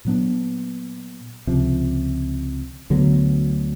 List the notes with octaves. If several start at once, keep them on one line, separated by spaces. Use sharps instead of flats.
A#2 F#3 B3 D4
C#2 C3 F3
D2 D3 F#3 B3